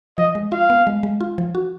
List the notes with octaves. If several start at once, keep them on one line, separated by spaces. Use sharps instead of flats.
F3 D#5
G#3
F4 F5
B3
G#3
G#3
F4
F3
F#4